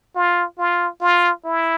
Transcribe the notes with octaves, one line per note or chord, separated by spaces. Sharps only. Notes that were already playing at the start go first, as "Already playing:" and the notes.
F4
F4
F4
E4